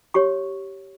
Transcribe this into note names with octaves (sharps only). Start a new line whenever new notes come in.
G4 C#5 C#6